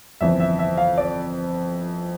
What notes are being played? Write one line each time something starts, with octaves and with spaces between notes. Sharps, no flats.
G1 F2 E3 E5
E5
E5
F5
D5